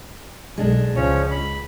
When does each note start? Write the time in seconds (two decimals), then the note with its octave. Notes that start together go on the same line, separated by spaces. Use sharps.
0.58 B1 G#3 D4
0.96 C#2 F3 C#4 C#5
1.31 B5